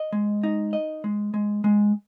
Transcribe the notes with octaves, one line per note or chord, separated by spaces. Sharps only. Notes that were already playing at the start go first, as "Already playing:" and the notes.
Already playing: D#5
G#3
D#4
D#5
G#3
G#3
G#3